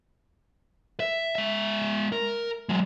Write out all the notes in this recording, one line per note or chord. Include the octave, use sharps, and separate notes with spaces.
E5
G#3 E5
A#4
F#3 G#3